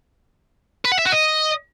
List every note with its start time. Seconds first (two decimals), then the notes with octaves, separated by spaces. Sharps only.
0.85 B4
0.92 F#5
0.99 E5
1.05 F#4
1.12 D#5